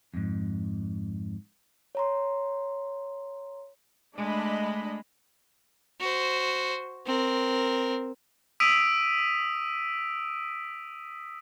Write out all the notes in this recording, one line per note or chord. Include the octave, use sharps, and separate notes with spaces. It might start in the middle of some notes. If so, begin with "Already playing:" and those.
F2 G#2
C#5 A#5 C6
G#3 A3 D4 D#5 B5
F#4 C5
C4 A#4
D#6 E6 B6 D7 D#7